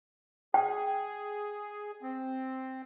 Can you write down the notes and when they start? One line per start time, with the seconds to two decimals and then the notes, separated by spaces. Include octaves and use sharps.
0.54 G#4 G5
2.02 C4